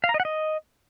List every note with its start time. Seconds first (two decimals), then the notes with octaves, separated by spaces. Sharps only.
0.04 F5
0.09 A#5
0.14 D#5
0.20 F#5
0.25 D#5